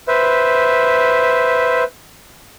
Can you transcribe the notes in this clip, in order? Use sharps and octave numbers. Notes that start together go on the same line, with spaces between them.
B4 C5 E5